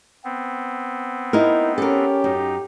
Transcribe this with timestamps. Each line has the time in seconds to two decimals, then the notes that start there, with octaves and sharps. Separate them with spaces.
0.24 B3 C4
1.33 D#4 E4 A#4
1.78 C#4 G4 A4 A#4
2.24 F#2 D#4